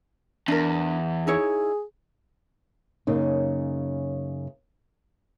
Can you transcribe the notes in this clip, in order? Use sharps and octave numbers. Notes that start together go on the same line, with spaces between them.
E2 D4 A#4
D#4 E4 G#4 C#5
F#2 C#3 A#3 D#4